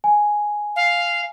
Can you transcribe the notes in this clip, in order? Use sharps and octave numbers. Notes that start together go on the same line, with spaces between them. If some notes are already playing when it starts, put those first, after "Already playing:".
G#5
F5